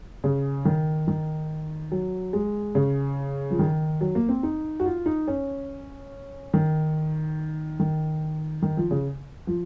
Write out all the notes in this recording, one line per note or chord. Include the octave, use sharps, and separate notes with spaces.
C#3
D#3
D#3
F#3
G#3
C#3
F3
D#3
F#3
A#3
C4
D#4
F#4
F4
D#4
C#4
D#3
D#3
D#3
F3
C#3
F3